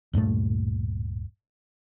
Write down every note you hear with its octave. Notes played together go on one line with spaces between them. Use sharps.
D1 G2 A#2 A3